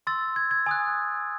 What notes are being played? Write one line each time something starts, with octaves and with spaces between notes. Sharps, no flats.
C6 E6 A6
G#6
G#6
G#5 D#6 F#6